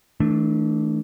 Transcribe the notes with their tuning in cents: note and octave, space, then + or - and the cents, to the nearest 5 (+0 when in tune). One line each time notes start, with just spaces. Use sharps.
E3 -40 A3 +0 D4 +0